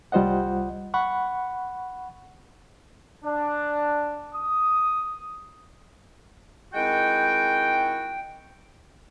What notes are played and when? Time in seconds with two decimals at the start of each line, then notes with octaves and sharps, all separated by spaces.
0.12 C2 G3 F4 C5 D#5 F#5
0.94 F#5 B5 C#6
3.24 D4
4.34 D#6
6.74 D#3 G#3 C4 E4 F#4 G5